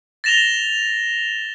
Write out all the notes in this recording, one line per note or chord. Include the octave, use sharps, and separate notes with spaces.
A6 A#6 E7 F7 G7